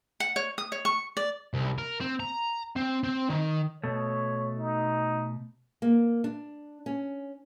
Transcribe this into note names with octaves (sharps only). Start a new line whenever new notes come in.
F#5
C#5
D#6
C#5
C#6
D5
C2
A#4
C4
A#5
C4
C4
D#3
B2 A3 C#5
D#4
A#3
D4
C#4